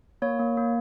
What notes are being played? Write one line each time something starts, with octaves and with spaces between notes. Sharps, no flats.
A#3 C#5
A#3
A#3